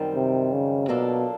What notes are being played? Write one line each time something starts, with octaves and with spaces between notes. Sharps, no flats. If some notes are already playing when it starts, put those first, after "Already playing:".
Already playing: F#2 D#3 G3 C4
C3
C#3
B2 F#3 A#3 D4 F4 A4